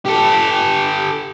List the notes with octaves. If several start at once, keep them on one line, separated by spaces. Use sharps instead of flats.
G4 A4